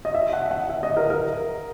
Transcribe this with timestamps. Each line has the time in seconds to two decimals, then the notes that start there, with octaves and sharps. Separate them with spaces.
0.05 D#5
0.15 E5
0.33 F#5
0.51 F#5
0.69 E5
0.83 D#5
0.97 A#4
1.10 A#4